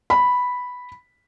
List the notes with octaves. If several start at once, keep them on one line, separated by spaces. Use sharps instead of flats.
B5